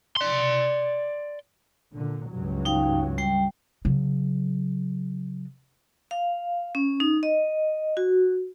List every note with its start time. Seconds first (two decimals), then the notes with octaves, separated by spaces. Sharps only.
0.17 D5 C6
1.93 A#2 D3
2.30 C#2 G2 F#3
2.65 D#4 F5 G5
3.18 G3 G5
3.85 C#3 F#3
6.11 F5
6.75 C#4
7.00 D#4
7.23 D#5
7.97 F#4